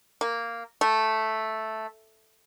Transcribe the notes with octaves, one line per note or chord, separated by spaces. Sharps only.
A#3
A3